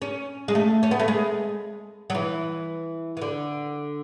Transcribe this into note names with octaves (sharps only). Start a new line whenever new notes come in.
C#4
G#3
A3
C#4
B3
A3
G#3
F#3
E3
E3
D3